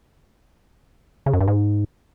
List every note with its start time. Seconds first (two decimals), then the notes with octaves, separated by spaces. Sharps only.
1.26 C#3
1.33 F#2
1.40 G2
1.48 G#2